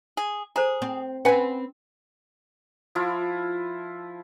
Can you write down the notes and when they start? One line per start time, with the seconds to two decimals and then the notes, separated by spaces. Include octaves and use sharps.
0.17 G#4
0.56 G#4 A4 C5 A#5
0.82 C4
1.25 C4 C#4 B4 F#5 G#5
2.95 F3 E4 F4